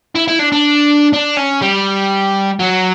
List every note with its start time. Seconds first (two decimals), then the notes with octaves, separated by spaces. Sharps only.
0.15 E4
0.28 E4
0.39 D4
0.52 D4
1.13 D4
1.37 C#4
1.61 G3
2.60 F#3